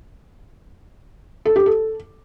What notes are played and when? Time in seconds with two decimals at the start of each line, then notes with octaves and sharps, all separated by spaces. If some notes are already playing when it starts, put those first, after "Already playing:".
1.45 A4
1.56 G4
1.66 A4